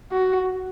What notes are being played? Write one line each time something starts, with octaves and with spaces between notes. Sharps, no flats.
F#4